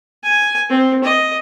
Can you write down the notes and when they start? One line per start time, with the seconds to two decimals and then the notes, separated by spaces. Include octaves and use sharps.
0.24 G#5
0.69 C4
1.04 D#5